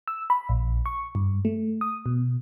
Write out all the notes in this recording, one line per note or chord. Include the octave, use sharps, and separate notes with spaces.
E6
B5
A#1
C#6
G2
A3
D#6
B2